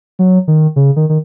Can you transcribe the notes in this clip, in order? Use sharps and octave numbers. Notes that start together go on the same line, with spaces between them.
F#3
D#3
C#3
D#3
D#3